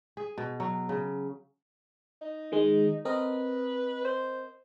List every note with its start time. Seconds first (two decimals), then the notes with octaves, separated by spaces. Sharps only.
0.17 G#4
0.38 B2
0.60 F#3
0.89 C#3
2.22 D#4
2.52 D#3 G#3
3.05 C4 A#4 B4 D#5
4.05 C5